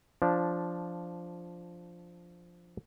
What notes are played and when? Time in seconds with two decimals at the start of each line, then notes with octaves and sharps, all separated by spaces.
0.22 F3 D4